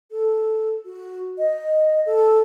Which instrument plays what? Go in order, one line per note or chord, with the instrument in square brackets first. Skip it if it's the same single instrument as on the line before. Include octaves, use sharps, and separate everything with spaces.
[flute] A4
F#4
D#5
A4